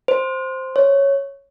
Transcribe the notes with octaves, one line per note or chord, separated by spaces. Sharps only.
C5
C#5